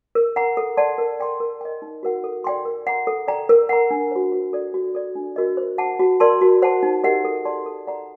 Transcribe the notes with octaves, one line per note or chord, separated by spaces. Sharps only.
A#4
F#5 A#5
A4
D5 F#5 A5 C6
A#4
D5 G5 C6
A#4
D#5 G5
D#4
F#4 A#4 F#5
A4
D5 G5 C6
A#4
F#5 A#5
A4
D5 G5 A#5
A#4
F#5 A#5
D4
F#4 C5
F#4
A4 D5
F#4
A4 D5
D4
F#4 A#4 D#5
C5
F#5 A5
F#4
A#4 D5 A5 C6
F#4
C5 F#5 A5
D#4
G4 A#4 D#5 F#5
A4
D5 A5 C6
A4
D5 F#5 A#5